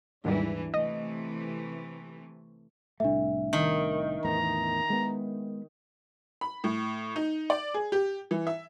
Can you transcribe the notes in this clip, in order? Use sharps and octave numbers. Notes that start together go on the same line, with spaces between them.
D#2 G#2 E3 G3 D4
C3 E3 A3 D#5
C2 A2 A3 D4 E5
D#3
E2 A2 B3 A#5
G#3 B3
B5
A2
D#4
D5
G#4
G4
E3
E5